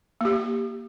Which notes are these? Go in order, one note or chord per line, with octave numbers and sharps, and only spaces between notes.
A#3 G4